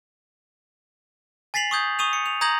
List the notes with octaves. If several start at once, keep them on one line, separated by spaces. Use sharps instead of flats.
G#5 A6 B6 C7 F7 F#7
C#6 D#6 G6 G#6
C#6 D#6 D#7 F7
C#7
F7
A#5 D#6 G6 G#6 A#6 F#7